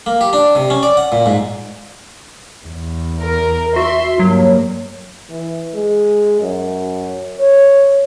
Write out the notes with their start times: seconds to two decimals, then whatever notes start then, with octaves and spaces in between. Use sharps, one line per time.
0.06 A#3
0.21 G4
0.33 D4
0.55 C3
0.70 C#4
0.83 D5
0.97 F#5
1.12 A#2
1.26 G#2
2.67 E2
3.21 A#4
3.76 F#4 E5 C6
4.19 G2 F#3 A#3
5.30 E3
5.74 G#3
6.41 F#2
7.40 C#5